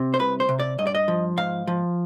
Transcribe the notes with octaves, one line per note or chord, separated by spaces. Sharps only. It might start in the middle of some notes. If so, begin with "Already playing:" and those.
Already playing: C3
C5
C2 B4
C5
C3
D5
G2 D#5
D5
D#5
F3
G#2 F5
F3